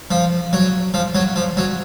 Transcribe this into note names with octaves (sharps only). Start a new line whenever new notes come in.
F3
F#3
F3
F#3
F3
F#3